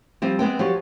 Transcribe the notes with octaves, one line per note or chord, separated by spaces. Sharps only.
F3 G3 C4
G#3 B3 C4 G5
F3 F#3 F#4 G4